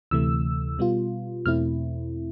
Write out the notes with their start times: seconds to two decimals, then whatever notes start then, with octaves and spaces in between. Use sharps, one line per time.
0.11 D2 C3 E3 A3 E6
0.78 B2 G3 B3 F4
1.46 E2 B2 A3 C4 E4 F6